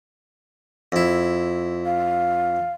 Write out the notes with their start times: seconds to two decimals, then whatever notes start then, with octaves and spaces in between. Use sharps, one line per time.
0.92 F2 E4
1.86 F5